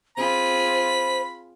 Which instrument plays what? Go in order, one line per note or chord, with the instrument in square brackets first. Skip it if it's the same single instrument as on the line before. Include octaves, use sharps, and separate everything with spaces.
[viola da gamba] C4 F4 G#4 [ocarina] C5 [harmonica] B5